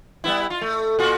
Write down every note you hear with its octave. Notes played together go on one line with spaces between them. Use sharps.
G3 B3 E4
F4
A3
A#2 F4 F#4